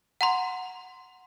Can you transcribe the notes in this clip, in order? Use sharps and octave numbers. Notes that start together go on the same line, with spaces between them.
F#5 A#5 C6